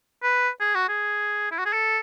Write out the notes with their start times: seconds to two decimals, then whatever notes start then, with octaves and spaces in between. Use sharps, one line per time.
0.23 B4
0.61 G#4
0.75 F#4
0.89 G#4
1.51 E4
1.58 F#4
1.66 G#4
1.73 A4